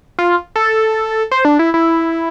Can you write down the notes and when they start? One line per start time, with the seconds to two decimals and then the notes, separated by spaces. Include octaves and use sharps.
0.19 F4
0.56 A4
1.31 C5
1.45 D4
1.59 E4
1.74 E4